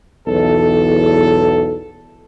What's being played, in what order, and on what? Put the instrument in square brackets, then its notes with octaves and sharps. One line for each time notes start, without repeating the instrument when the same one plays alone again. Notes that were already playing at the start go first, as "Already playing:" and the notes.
[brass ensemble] B1 E2 A4